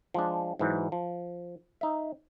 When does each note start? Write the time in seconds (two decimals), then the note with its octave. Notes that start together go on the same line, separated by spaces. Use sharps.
0.14 F3 G#3 D4
0.59 G#2 E3 F#3
0.92 F3
1.81 D#4 E5